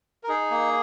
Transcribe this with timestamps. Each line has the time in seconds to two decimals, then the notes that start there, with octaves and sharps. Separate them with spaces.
0.23 A#4
0.29 D#4 G#4
0.51 A#3